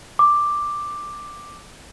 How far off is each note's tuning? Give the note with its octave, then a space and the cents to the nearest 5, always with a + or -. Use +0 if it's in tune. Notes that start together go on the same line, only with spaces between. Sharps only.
D6 +5